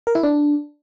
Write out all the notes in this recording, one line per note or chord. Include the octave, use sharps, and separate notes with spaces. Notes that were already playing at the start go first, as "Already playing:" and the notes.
A#4
E4
D4